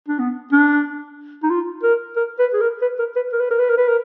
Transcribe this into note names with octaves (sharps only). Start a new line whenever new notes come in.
D4
B3
D4
D#4
F4
A#4
A#4
B4
G#4
A#4
B4
A#4
B4
A#4
B4
A#4
B4
A#4
B4
A#4